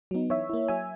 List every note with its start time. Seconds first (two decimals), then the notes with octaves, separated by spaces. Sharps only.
0.11 F#3 B3 D#4
0.30 E3 C#5 E5
0.49 A#3 E4
0.68 F#3 E5 G#5